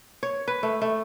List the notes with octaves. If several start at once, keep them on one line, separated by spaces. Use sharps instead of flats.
C#5
B4
A3
A3